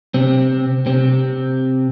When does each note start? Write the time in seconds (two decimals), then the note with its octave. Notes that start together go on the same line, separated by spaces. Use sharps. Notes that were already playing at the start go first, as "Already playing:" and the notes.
0.14 C3 C4
0.86 C3 C4